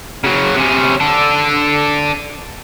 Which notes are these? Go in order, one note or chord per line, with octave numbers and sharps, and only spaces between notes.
C#3 F#3
C3 C#4
D4 A4